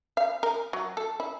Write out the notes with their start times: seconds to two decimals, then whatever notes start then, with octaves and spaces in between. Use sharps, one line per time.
0.17 F5
0.43 A#4
0.73 F#3
0.97 A4
1.20 E4